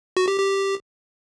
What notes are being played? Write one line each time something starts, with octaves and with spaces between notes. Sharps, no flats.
F#4
G4
G4